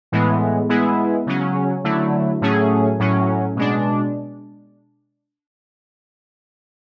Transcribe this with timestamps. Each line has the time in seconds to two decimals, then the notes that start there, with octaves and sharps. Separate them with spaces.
0.12 A2 E3 G#3 B3
0.69 G#3 B3 E4 G#4
1.26 C#3 F#3 C#4
1.84 D3 F#3 A3 E4
2.41 A2 F#3 A3 C#4 G#4
2.99 A2 F#3 C#4
3.56 B2 G#3 D4